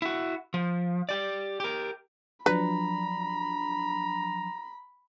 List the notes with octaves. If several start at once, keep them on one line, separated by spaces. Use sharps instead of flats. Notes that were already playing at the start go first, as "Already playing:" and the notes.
E4 F#4
F3
G4 D5
G4 A#4
F3 F#3 D4 B4 A#5 B5